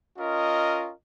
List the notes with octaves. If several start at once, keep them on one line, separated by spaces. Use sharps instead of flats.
C#4 F4 A#4 D#5